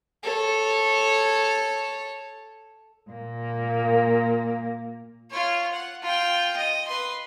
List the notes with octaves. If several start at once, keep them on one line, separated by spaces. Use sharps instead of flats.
A4 C#5
A#2 A#3
F4 C#5
F#5
F4 G5
D#5
B4 C6